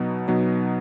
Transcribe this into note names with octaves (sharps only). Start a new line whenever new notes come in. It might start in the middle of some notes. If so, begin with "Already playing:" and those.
Already playing: B2 F#3 B3 D#4
B2 F#3 B3 D#4